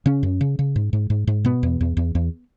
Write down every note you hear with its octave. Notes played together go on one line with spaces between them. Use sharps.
C#3 C#4
F#2
C#3
C#3
G#2
G#2
G#2
G#2
B2 B3
E2
E2
E2
E2